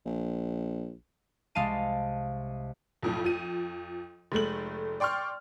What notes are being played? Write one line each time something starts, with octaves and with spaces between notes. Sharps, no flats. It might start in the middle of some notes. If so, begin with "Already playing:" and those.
A#1
C2 G#3 F5 A5 D#7
B1 F2 A2
F2 F3 D#7
F1 G#3 A3 F#7
D5 G5 C6 C#6 F6